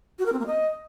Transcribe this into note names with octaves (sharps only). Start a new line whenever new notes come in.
F#4
A#4
C4
A#3
D#5